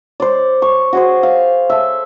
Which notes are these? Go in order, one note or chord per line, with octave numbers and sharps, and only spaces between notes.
C5 D5
C#6
F#4 G#4 C5
F5
A4 E5